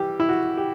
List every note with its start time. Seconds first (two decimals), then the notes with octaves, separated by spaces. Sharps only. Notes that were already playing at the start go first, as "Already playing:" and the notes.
Already playing: E3 G3 G4
0.20 E4
0.29 F#4
0.57 G4